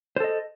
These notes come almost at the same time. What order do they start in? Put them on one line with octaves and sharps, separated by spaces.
C5 A4 D#5